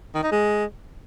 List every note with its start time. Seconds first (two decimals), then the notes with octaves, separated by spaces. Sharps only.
0.15 D#3
0.23 D#4
0.32 G#3